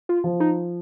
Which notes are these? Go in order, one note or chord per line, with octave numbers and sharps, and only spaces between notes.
F4
F3
D#4